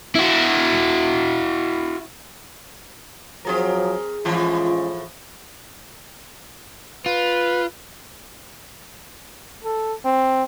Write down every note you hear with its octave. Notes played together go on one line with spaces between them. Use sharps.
E4 F#4
F3 F#3 C4 G#4 A#4
A2 E3 F3 G#3 C#4 F4
F4 B4
A4
C4